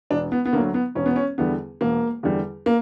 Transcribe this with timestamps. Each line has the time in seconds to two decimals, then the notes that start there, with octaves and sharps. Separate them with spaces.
0.10 E1 D4
0.32 B3
0.45 B3
0.53 D2 D3 F#3 A#3
0.74 B3
0.95 E1 C#4
1.06 B3
1.16 C#4
1.38 E2 D3 G3 B3
1.81 E1 A#3
2.23 E2 D3 G3
2.66 A#3